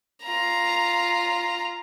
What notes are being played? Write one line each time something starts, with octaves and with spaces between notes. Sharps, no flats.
F4 A#5